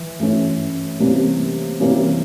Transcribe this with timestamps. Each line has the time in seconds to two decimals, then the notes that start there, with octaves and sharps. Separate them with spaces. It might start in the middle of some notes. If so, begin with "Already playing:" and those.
Already playing: E3
0.20 E3 A3 C#4
1.00 C3 E3 G3 A#3 C#4
1.80 C3 E3 G3 A#3 C#4